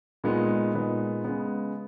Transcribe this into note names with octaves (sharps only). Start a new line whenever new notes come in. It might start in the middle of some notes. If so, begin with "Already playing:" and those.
A#2 G#3 B3 D#4
A#2 G#3 B3 D#4
C#3 G#3 B3